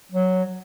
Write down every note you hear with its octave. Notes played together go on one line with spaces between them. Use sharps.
F#3